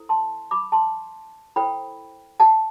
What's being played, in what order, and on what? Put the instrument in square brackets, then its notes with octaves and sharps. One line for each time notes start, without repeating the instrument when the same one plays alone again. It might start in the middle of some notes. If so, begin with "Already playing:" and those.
Already playing: [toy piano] E4 A4 C5
A5 C6
B5 D6
A5 C6
E4 A4 C5 G5 B5
F#5 A5